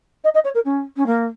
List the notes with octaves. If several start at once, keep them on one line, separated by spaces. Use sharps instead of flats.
D#5
D#5
C#5
A#4
C#4
C#4
A#3